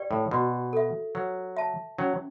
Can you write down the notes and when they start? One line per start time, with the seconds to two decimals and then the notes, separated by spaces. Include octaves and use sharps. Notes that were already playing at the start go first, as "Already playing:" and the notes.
Already playing: G4 B4 D5 G5
0.11 A2
0.31 B2 F#4
0.73 A4 E5
1.15 F#3 B4
1.57 E5 A5
1.98 F#3 C#4